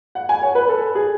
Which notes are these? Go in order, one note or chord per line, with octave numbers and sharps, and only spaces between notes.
F#5
G#5
C#5
B4
A4
G#4